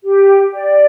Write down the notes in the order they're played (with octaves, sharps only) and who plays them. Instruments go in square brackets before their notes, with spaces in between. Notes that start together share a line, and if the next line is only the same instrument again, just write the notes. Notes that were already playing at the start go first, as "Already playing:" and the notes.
[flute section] G4
D5